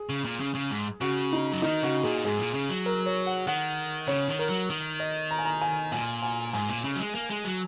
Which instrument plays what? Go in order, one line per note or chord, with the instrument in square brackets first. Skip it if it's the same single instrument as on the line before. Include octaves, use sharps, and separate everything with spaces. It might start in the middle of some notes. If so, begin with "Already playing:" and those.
Already playing: [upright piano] G#4
[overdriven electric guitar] C#3
A#2
C#3
C#3
G#2
[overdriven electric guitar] C#3 [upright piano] F#4
[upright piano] D#4
[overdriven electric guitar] F#3
[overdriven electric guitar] D#3 [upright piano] D#4
[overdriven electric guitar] C#3 [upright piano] F#4
[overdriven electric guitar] A#2 [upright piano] G#4
[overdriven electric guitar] G#2 [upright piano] G#4
[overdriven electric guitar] A#2
C#3
F#3
[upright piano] A#4
C#5
F#5
[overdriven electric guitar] D#3 [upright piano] F#5
[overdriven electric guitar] C#3 [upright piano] C#5
[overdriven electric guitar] D#3
[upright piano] A#4
[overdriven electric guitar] F#3
D#3
[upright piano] D#5
A#5
G#5
A#5
G#5
[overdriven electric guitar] A#2 [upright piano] G#5
[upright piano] G#5
[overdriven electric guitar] G#2 [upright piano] G#5
[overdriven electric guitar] A#2
C#3
F#3
G#3
A#3
G#3
F#3